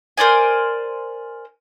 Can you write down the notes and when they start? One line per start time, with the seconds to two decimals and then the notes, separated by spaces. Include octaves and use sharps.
0.17 A#4 C5 D5 G#5